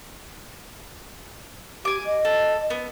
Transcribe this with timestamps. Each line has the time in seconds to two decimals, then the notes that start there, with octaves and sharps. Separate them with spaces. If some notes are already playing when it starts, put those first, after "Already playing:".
1.85 G4 G#5 D6
2.05 D#5
2.25 A4
2.70 B3